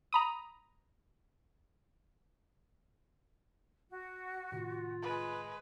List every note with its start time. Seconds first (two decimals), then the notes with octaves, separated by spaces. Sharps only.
0.13 A#5 B5 D#6
3.89 F#4
4.52 A2 C3 D#3 F4
5.02 G#3 B4